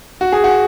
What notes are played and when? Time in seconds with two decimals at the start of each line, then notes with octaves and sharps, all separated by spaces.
0.21 F#4
0.32 G#4
0.44 F#4